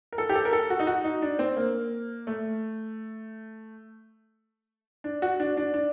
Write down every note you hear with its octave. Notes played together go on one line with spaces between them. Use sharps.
A#4
A4
G4
A4
A#4
A4
F#4
D#4
F#4
D#4
D4
C4
A#3
A3
D4
F#4
D4
D4
D4